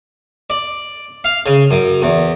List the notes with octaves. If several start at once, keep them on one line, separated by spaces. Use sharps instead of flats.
D5
F5
C#3
F#2
E2